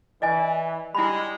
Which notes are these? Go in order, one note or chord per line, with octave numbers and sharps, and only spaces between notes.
E3 D5 D#5 G#5
G3 G#3 E4 B5